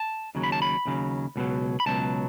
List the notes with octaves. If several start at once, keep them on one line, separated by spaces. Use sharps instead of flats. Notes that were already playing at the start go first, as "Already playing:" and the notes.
Already playing: A5
D#2 C#3 F#3
B5
A5
B5
D#2 C#3 F#3
C#2 B2 F#3
B5
C#2 B2 F#3 A5